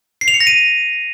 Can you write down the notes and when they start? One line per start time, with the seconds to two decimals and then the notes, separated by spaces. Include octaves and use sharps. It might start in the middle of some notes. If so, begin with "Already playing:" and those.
0.21 C7
0.28 F7
0.34 C#7
0.40 A#6
0.47 D#7